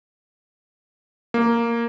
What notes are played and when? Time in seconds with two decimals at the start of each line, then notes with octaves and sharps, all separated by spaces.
1.34 A#3